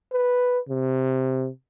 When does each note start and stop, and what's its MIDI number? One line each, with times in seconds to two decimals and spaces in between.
0.13 0.59 71
0.69 1.49 48